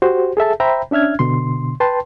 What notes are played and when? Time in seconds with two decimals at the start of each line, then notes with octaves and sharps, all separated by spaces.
0.02 F#4 G4 C5
0.37 G#4 A4 E5 A5
0.60 C5 E5 G5 A#5 B5
0.91 C#4 D4 E5 F6 G#6
1.19 B2 D3 C6
1.80 B4 G5 A5 C6